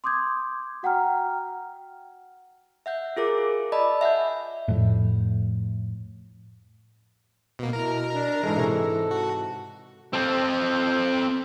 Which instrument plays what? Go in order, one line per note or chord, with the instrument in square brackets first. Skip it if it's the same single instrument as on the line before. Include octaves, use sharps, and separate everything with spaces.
[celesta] C6 D6 D#6 G6 G#6
F#4 F#5 G5 A#5 F6
[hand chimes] E5 F#5 G6
F4 G#4 A#4 D6
F4
D5 D#5 A5 B5 E6
E5 F#5 G#5 G6
F#5
[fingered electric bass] F2 A2
[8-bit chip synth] B2 A#3
[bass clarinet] B2 [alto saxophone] E4 [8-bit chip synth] A#4 A#5
[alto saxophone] D4
[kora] G#2 G#3 [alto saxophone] E3 [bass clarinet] A4
[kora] C3 C#5
[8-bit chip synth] F#4
[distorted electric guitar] C4 A4